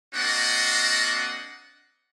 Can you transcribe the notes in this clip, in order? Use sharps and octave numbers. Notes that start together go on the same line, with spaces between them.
A#3 C4 D4 F#4 D#5 F#5